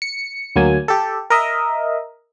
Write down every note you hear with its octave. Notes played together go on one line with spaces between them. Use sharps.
C#7
D2 F#3 A#3 G#5
G4 A4
A#4 D#5 E5